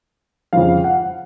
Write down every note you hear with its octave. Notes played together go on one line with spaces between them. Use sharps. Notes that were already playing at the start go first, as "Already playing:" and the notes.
F2 C#3 F3 F5
F#5